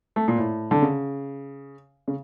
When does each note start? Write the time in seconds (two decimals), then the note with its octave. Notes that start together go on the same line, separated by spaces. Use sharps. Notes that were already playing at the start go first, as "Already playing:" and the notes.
0.16 A3
0.28 A#2
0.38 A2
0.71 D3
0.82 C#3
2.08 C#3